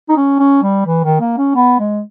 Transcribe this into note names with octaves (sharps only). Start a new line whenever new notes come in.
D#4
C#4
C#4
G3
E3
D#3
A#3
C#4
B3
G#3